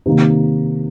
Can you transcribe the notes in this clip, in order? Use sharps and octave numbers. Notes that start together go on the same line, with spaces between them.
C3 D#3 A#3